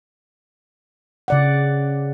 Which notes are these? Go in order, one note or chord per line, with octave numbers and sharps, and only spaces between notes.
C#3 D5 F#5